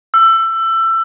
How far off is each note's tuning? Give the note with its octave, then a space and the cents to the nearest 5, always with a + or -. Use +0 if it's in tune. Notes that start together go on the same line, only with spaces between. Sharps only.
E6 +20